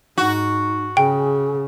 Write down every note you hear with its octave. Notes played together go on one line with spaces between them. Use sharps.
G#2 D#4 F#4
C#3 G#4 G5